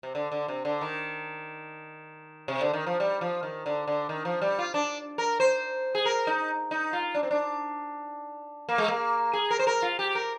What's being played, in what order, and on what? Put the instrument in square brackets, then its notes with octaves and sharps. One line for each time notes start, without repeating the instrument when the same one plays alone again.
[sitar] C3
D3
D3
C3
D3
D#3
C3
D3
D#3
F3
G3
F3
D#3
D3
D3
D#3
F3
G3
F4
D4
A#4
C5
G#4
A#4
D#4
D#4
F4
D4
C4
D4
A#3
G#3
A#3
G#4
A#4
C5
A#4
F4
G4
A#4